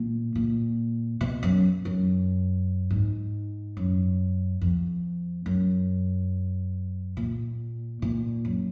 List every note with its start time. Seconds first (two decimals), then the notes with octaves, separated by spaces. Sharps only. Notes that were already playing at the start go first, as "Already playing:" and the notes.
Already playing: A#2
0.35 A#2
1.21 B2
1.43 F#2
1.85 F#2
2.91 G#2
3.77 F#2
4.61 F2
5.46 F#2
7.17 A#2
8.02 A#2
8.45 F#2